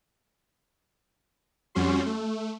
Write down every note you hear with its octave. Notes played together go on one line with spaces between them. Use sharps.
F2 G3 C#4 F#4 C6
A3